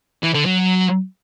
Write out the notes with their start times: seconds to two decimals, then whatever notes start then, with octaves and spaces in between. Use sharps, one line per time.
0.23 E3
0.34 D3
0.45 F#3